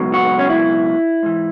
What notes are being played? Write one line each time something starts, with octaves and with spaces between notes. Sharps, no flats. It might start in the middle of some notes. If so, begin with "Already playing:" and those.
Already playing: C#2 B2 F#3
F#4
C#4
E4
G#2 E3